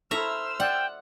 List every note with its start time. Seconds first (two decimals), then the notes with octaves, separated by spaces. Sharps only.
0.11 E4 A4 C5 E5 A#5 C#6 E6 F6
0.60 D5 F#5 G5